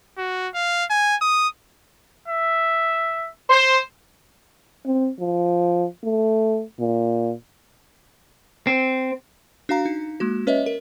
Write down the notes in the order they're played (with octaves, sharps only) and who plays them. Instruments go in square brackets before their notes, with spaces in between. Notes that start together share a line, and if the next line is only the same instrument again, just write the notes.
[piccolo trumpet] F#4
F5
G#5
D#6
E5
[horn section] C5
[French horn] C4
F3
A3
A#2
[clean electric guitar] C4
[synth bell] D4 F#4 F5 A#5
D#4
G#3 A#3 F#4
C#4 B4 C#5 D#5 E5
A#4